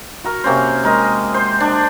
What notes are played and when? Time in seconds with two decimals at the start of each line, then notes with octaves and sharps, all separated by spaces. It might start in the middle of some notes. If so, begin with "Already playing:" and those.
0.24 F#4 A#4
0.44 C3 A#3 C#4 C5
0.83 G#3 A#4 D#5
1.34 C5
1.60 D4